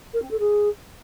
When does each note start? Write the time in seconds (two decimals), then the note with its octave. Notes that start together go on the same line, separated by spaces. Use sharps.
0.13 A#4
0.22 C4
0.31 A4
0.39 G#4